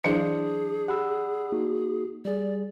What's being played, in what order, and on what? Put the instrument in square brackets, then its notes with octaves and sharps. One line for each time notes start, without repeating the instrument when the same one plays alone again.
[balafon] E3 F#3 E4 [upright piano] D4 C5 C#7 [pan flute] G#4
[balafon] G4 [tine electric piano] F#5 B5 E6
[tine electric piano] A#3 D#4 F#4
[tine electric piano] G3 G#4 [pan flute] D5